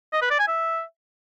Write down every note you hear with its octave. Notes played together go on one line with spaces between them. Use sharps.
D#5
B4
D5
G#5
E5